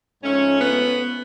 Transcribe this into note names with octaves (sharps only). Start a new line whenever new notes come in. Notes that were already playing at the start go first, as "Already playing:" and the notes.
G#2 F3 A3 C#4
B3